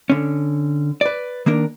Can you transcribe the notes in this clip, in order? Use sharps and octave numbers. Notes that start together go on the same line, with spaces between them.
D3 C#4
B4 D5
D#3 A#3 D4 A#4